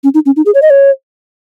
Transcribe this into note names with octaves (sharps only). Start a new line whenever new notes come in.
C#4
D#4
C#4
D#4
G#4
C#5
D#5
C#5